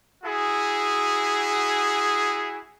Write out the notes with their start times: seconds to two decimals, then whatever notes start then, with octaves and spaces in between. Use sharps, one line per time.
0.24 E4 F#4 G#4